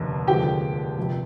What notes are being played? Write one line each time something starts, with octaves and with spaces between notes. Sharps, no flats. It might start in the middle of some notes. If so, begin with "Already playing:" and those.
Already playing: F1 D#2 D3
F1 D#2 D3 F3 G#3 G4 G5
F1 F2 C3